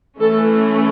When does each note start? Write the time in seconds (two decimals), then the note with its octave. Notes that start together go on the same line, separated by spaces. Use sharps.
0.20 E3 A3 C#4 A4